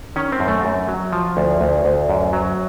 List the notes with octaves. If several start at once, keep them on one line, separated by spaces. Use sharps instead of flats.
D#3 C#4
C4
F#2
A3
F#2
F#3
F3
D2
D2
D2
F#2
F#3